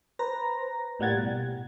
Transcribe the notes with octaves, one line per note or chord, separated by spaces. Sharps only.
B4 C5 A#5 A#6
A2 G3 A#3 F#5 G#6 A6
B2